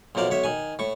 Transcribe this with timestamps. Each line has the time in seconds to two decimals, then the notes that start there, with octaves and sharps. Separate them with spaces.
0.15 B1 F#2 F3 A#4 D5
0.31 B1 C#5 E5
0.44 D#3 G#5
0.79 A2 C#6